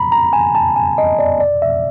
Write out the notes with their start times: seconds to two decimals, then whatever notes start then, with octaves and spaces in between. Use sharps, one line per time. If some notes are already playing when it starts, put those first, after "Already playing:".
Already playing: A#5 B5
0.12 A#5
0.33 G#5
0.55 A5
0.76 G#5
0.98 D#5
1.19 D5
1.40 D5
1.62 E5